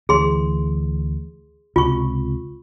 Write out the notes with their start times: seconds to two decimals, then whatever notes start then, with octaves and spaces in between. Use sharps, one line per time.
0.09 D2 E3 G#4 C6
1.76 C#2 C3 F4 C#6